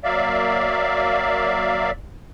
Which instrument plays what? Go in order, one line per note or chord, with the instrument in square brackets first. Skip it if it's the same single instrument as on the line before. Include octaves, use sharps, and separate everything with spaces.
[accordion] F#3 A#3 D5 E5 F5